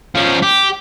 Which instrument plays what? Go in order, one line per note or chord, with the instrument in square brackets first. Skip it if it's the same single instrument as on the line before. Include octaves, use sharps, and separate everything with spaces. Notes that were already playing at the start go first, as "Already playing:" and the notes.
[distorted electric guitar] F3 C#4
G4